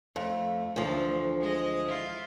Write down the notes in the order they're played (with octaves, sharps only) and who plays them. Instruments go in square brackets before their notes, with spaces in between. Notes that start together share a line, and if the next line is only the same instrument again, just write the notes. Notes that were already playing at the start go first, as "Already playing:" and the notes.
[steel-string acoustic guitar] F2 [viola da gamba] A3
[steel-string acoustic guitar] D2 F3 [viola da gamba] D3 E3
[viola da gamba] G#3 D#5
E4 F4